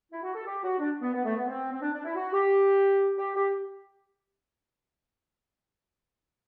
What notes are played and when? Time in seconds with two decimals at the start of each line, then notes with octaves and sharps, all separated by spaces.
0.12 E4
0.22 F#4
0.34 A4
0.45 G4
0.63 F#4
0.79 D4
1.01 B3
1.13 B3
1.25 A3
1.36 B3
1.48 C4
1.71 C4
1.81 D4
1.92 D4
2.04 E4
2.15 F#4
2.32 G4
3.17 G4
3.34 G4